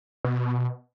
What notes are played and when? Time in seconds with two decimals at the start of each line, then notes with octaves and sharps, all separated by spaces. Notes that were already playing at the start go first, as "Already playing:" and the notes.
0.25 B2